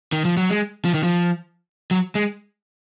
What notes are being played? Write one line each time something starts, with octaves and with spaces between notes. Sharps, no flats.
D#3
F3
F#3
G#3
F3
D#3
F3
F#3
G#3